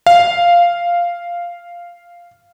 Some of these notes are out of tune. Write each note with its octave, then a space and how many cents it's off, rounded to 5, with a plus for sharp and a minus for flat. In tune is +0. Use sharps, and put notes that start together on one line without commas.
F5 -5